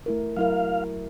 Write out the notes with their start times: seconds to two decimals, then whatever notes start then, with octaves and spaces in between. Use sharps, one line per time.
0.06 A3 E4 A#4
0.36 F#3 E4 A#4 F5